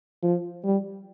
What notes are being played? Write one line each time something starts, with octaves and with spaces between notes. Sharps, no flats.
F3
G3